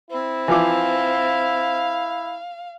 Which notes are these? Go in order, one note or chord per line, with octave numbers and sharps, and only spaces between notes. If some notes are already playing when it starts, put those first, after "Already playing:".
C4 E4
E3 F3 F5 D6